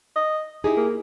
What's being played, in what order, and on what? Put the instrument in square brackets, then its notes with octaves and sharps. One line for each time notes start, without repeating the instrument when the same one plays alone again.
[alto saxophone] D#5
[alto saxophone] D#4 [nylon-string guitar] E4 G4 G#4
[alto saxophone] A#3